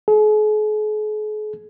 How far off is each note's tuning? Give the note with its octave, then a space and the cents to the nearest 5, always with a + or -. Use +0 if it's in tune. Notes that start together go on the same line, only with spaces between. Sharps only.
G#4 +45